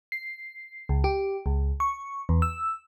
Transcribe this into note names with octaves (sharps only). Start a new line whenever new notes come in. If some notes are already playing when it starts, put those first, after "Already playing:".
C7
C#2
G4
C#2
C#6
E2
E6